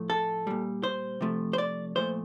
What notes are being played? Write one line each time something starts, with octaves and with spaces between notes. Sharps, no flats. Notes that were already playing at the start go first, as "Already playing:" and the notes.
Already playing: A2 F3 A3
A4
A#2 G3
C5
C3 F3 A3
C5
D5
A#2 F3 A3 C5